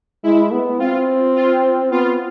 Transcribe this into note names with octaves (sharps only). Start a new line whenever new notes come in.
G#3 E4
B3
C4 F4
F4
B3 F4